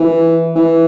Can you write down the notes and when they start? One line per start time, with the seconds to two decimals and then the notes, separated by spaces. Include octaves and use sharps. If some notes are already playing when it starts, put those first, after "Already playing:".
Already playing: E3
0.56 E3